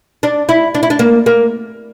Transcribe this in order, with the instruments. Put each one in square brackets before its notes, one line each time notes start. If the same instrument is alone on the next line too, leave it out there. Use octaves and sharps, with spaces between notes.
[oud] D4
E4
D4
E4
D4
A#3
A#3